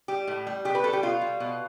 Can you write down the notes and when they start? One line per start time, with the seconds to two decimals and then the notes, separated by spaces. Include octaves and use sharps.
0.08 G3 G4
0.28 A2
0.47 G3
0.65 B2 G4
0.75 B4
0.83 G3 A4
0.93 G4
1.03 B2 F4
1.21 G3
1.40 B2